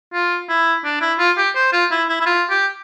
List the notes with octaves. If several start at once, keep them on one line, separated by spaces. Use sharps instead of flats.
F4
E4
D4
E4
F4
G4
C5
F4
E4
E4
E4
F4
G4